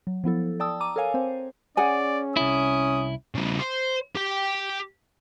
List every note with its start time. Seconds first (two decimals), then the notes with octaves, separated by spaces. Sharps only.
0.07 F#3
0.24 F3 B3 E4 A4
0.60 D5 G5 A5 D#6 E6
0.80 A#5 D6 D#7
0.96 A4 A#4 C#5 F5 G#5
1.14 C4 C5
1.77 C#4 G#4 D5 F#5 G#5
2.37 C2 C#4 E4 D#6
3.35 C#3 G3
3.59 C5
4.15 G4 G5